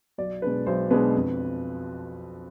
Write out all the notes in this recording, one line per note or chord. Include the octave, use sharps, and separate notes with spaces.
B1 D5
B2 G#3 D4 B4
B1 C5
B2 G#3 D4 B4
F2